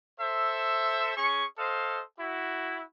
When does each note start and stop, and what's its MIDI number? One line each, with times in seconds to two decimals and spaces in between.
0.20 1.14 69
0.20 1.14 72
0.20 1.14 76
1.17 1.44 61
1.17 1.44 68
1.17 1.44 85
1.58 2.02 69
1.58 2.02 72
1.58 2.02 75
1.58 2.02 77
2.19 2.83 64
2.19 2.83 66